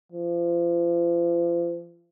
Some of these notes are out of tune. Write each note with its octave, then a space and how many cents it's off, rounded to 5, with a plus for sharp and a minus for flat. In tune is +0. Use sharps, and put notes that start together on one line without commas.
F3 -35